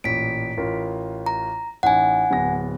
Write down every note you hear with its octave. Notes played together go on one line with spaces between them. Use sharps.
A1 A#2 B6 D7
A1 F4 A#4
A#5
A1 D#4 F#5 G#5
D1 B3 A#6